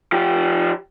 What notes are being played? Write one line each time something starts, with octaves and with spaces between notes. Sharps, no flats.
F3 G4